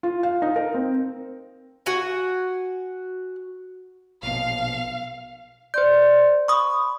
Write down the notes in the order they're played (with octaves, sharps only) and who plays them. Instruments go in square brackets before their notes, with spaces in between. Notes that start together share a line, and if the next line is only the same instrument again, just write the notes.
[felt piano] F4
F5
D#4
A#4
C4
[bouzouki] F#4 F#5 G#5
[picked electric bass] A#1 B2 [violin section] F5
[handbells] C5 G6 [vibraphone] D5 C6
[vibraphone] B5 [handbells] C#6 D#6